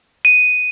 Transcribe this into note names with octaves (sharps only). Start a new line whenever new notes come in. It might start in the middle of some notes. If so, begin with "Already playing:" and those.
D#7